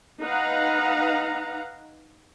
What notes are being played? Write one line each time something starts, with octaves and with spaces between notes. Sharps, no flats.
D#4 B4 F5 F#5 A#5